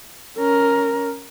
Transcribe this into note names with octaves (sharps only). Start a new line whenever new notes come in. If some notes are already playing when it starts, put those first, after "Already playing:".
C#4 A#4